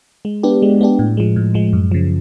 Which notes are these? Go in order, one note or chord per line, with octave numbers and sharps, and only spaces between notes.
G#3
B3 D4 G4
G#3
B3 D4 G4
A2
F3 G#3
A2
F3 G#3
F#2
C#3 F3